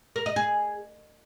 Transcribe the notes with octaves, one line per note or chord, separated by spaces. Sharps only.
A#4
D#5
G#4